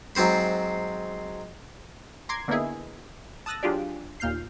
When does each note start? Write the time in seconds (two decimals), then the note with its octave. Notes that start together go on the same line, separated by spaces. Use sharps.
0.15 G#2 F#3 C4 C5 B5
2.29 A#5 C6 D6 G#6
2.48 D3 A#3 B3 D#4 E4 G#4
3.46 A5 D#6 E6 F#6 A6 A#6
3.63 F#3 D4 F4 G4 G#4 D5
4.20 D#2 A#2 F6 G6 C7